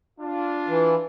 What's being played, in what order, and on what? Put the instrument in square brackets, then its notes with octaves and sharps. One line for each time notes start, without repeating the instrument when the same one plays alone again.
[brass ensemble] D4 F4
[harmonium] E3